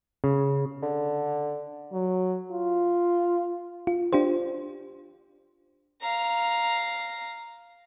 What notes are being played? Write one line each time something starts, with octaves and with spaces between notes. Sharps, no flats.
C#3
D3
F#3
F4
F4
D4 F4 G4 C5
F5 A#5